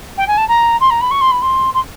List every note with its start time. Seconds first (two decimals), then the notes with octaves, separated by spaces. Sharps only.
0.17 G5
0.27 G#5
0.37 A5
0.48 A#5
0.80 C6
0.90 A#5
1.00 B5
1.10 C#6
1.21 C6
1.31 B5
1.41 C6
1.73 C6